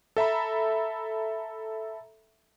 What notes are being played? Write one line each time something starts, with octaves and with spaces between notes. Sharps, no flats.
A4 E5 A#5 B5